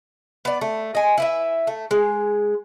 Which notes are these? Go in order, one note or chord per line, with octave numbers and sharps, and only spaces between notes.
B3 D5
A3
D#5 G#5
E4 B4 E5
A3
G#3